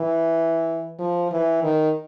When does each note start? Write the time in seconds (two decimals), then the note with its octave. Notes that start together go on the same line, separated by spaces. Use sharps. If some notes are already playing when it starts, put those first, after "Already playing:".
Already playing: E3
0.99 F3
1.31 E3
1.63 D#3